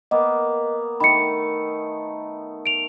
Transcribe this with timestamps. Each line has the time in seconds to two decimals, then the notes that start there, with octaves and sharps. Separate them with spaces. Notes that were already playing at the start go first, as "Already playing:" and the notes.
0.11 A#3 B3 D#5
1.00 D#3 A3 B5 C#7
2.66 D7 F7